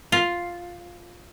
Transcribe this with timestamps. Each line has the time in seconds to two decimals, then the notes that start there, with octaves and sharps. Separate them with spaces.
0.12 F4